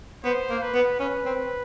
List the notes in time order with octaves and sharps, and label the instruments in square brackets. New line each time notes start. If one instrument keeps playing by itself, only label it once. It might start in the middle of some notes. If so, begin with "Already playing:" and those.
[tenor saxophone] B3 [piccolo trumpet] C5
[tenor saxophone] A#3
[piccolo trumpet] B4
[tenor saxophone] B3
[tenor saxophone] C#4 [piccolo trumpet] B4
[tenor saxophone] C4